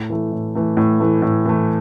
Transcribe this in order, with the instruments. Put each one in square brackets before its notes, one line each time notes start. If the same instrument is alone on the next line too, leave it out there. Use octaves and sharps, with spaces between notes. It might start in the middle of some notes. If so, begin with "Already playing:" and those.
Already playing: [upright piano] A2
E3 A3
A2
E3 A3
A2
E3 A3
A2
E3 A3